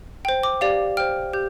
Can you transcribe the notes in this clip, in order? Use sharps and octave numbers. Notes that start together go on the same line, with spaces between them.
C5 G5
D6
G4 D5 F5
C5 G5 F6
G4 G6